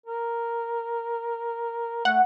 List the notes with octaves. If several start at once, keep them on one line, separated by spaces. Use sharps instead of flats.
A#4
A3 F#5